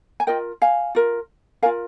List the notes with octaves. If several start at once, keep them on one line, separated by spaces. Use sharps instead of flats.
G#5
F4 A#4 D#5 G5
F5 G#5
F4 A#4
F4 A#4 F5 G#5